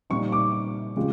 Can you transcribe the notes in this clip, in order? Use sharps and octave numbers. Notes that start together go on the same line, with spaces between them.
A#2 G3 C4 D#4 C#6
D6
C#3 F3 G#3 C4